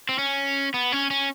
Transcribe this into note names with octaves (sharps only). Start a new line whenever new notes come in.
C4
C#4
B3
C#4
C#4